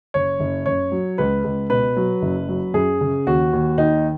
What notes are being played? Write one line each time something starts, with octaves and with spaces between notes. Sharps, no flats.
F#1 C#5
F#1
F#2 C#5
F#3
C#2 B4
C#2
B2 B4
F#3
F#1
F#3
F#2 G#4
C#3
D#2 F#4
D#2
D#3 D#4